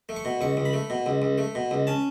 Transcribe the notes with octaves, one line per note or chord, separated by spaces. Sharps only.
A3
C#6
B2
C#2 C#6
C#2
B5
A3
B2
C#2
C#2
A3
B2
C#2
C#4 A5